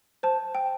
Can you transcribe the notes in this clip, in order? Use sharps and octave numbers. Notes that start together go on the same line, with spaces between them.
C5 A5
G5